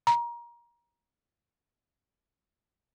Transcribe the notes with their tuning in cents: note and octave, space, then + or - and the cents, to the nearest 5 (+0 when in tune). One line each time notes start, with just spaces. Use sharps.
A#5 +25